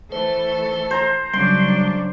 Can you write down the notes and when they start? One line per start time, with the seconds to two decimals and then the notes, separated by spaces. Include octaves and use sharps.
0.12 E3 A3 A4 C5
0.91 C5 A#5 C6
1.34 C#3 F#3 G3 D4 C6